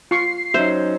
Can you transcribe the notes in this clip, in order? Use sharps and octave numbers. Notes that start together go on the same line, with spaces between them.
F4 C#6 C7
F#3 C#4 D#4 C5 E5